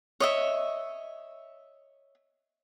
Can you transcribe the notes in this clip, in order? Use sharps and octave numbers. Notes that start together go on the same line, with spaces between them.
C#5 D#5 E5